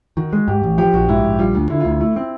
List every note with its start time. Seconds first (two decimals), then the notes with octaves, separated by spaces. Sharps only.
0.17 D#3 F#4
0.33 G#3
0.48 G#2 G4
0.63 A1
0.78 F3 G4
0.94 A#1 F#4
1.09 G#2 E4
1.24 A#1
1.39 G3 F4
1.55 D2
1.70 D3 E4
1.80 F4
1.85 D2
1.90 F4
2.01 A3 E4
2.16 C4